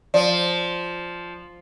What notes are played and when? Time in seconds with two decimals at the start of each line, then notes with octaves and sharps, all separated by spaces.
0.14 F3 D5